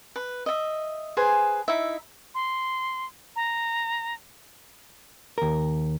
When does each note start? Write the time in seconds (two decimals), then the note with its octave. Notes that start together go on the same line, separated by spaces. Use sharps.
0.16 B4
0.46 D#5 E5
1.17 G#4 B4 C5 G#5
1.68 D#4 E4 E5
2.35 C6
3.36 A#5
5.38 D#2 A#4